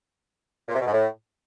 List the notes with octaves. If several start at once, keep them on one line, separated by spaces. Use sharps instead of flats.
A#2
C3
B2
G#2
A2